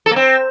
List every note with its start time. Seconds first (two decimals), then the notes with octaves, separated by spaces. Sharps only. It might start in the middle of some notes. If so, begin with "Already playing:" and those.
0.06 A4
0.11 A#3
0.16 C4